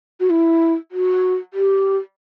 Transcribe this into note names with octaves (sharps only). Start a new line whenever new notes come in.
F#4
E4
F#4
G4